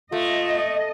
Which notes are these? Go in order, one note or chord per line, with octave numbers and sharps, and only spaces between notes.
A3 F4 D#5